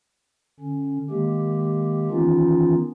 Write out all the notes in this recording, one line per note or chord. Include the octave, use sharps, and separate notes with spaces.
D3 C#4
D#3 G#3 A#3 G4
D#3 E3 B3 C#4 D#4 F4